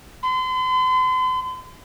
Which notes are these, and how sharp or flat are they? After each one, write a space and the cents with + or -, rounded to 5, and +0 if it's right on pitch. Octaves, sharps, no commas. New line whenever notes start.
C6 -40